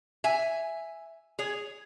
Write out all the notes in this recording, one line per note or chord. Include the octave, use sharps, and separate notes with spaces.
E5 G#5
G#4 C#5